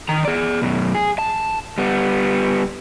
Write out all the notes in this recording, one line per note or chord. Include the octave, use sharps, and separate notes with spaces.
D#3 A#5
G#4 D5
F#2 B2
G#4
A5
G3 B3